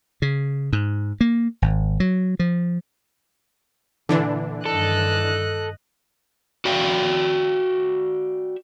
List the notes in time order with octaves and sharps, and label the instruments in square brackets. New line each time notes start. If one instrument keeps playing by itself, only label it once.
[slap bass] C#3
G#2
A#3
G#1
F#3
F3
[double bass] A#2 [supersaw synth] D3 E3 D4
[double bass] G2 D#3 [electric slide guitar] A4 [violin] D#5 F#6
[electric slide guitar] F#4 D5 E5 F5 G5